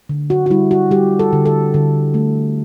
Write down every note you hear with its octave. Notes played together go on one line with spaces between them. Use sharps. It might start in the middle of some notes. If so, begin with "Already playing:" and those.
D3
F#4
F#4
G3 E4
F#4
G3 G4
A4
D3
A4
D3
A3